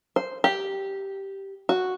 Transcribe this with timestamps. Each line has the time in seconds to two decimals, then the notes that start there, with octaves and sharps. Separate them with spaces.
0.16 C5
0.44 G4
1.69 F#4